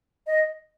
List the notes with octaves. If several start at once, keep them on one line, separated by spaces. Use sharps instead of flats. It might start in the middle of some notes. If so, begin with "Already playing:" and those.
D#5